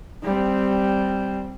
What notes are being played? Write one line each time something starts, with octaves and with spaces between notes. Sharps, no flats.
G3 C4